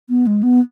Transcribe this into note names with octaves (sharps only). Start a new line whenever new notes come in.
B3
G#3
B3